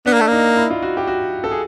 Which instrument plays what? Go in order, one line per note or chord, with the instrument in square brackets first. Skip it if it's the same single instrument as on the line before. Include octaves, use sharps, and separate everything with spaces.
[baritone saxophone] B3 [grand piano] D4
[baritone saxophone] A#3
A3
[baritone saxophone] A#3 [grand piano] D#4
[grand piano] E4
F4
F#4
G4
F#4
A4
G#4